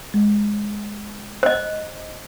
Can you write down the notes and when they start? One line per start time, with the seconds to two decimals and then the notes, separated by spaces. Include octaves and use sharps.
0.14 G#3
1.43 C5 D#5